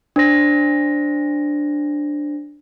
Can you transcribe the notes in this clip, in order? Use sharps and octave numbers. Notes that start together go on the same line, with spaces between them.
D4 C5 A#6